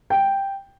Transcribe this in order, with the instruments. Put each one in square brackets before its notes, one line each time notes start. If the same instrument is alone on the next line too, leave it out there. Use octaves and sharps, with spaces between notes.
[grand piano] G5